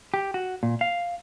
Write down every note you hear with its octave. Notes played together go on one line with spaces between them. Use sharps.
G4
F#4
A#2
F5